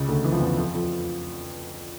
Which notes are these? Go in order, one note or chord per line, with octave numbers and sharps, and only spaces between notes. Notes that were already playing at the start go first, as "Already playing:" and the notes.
Already playing: C#2 C#3
D2 D3
E3
F3
E2 E3
F2 F3
F2 F3